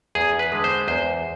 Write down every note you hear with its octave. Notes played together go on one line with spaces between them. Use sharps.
E2 G#4
B4
D3 G#3
C5
E2 C5